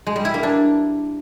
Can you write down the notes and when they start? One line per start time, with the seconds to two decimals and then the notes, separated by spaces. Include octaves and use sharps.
0.07 G#3
0.16 G3
0.25 E4
0.34 A#3
0.43 D4